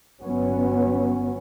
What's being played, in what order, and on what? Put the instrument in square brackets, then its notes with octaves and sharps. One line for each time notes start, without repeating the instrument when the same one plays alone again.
[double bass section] G1 F#3 B3 C#4